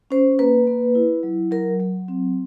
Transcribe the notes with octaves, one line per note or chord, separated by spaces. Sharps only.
C#4 C5
A#3 B4
A#3
E4
F#3
F#3 A#4
F#3
C4